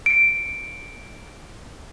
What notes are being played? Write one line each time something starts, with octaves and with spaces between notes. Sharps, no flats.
C#7 D7